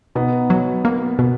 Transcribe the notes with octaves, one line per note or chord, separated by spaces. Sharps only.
B2 B3 D#4
F#3
A#3
B2